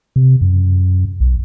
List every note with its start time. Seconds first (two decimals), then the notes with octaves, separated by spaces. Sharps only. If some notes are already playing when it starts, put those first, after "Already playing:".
0.16 C3
0.41 F#2
1.20 B1